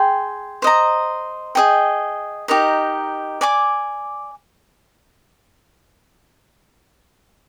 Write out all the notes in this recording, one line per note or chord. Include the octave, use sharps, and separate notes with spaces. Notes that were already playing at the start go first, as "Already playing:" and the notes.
Already playing: G#4 G5 C6
C5 D#5 A#5
G#4 D#5 G5
D#4 G4 A#4 D#5
D5 G#5 D6